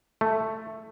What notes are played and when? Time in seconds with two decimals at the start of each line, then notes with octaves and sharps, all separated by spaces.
0.21 A3